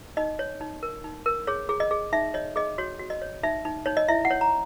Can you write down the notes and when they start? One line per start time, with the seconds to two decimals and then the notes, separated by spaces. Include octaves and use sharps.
0.17 D#4 D#5
0.39 C#5
0.61 D#4
0.83 A#4
1.04 D#4
1.26 A#4
1.47 G#4 C#5
1.69 G#4
1.80 D#5
1.91 G#4
2.13 D#4 E5
2.34 C#5 D#5
2.56 G#4 D#5
2.78 F#4 C#5
2.99 F#4
3.10 D#5
3.22 C#5
3.43 D#4 E5
3.65 D#4
3.86 D#4 C#5
3.97 D#5
4.08 E4 E5
4.25 F#5
4.31 C#5
4.41 A#5